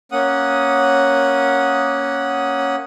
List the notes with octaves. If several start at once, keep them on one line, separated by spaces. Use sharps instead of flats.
A#3 C#4 F#5 D#6